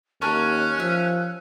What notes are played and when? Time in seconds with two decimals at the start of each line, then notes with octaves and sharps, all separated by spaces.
0.22 D#2 C#4 A#4 C#5 A5 F#6
0.79 F3 E5